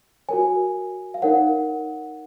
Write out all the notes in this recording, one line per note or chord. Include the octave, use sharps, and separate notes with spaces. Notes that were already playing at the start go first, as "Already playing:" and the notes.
F#4 A#4 C#5 G#5
F5
D#4 A#4 C#5 F#5